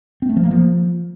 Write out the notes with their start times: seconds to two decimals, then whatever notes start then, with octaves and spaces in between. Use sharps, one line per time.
0.22 C4
0.29 A3
0.36 F3
0.44 A#3
0.51 F3